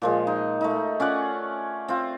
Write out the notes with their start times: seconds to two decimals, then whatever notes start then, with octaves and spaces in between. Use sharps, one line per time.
0.02 A#2 F3 G#3
0.27 D#4
0.61 A3 D#4
1.00 C#4 F4 D5 F#5
1.88 C4 F4